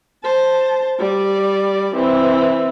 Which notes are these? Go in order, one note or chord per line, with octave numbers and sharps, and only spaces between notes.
C5 A5
G3 D5
E3 C4